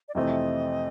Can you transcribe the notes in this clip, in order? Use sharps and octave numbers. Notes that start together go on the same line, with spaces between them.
D5
F2 C3 E3 A3 C4 D#5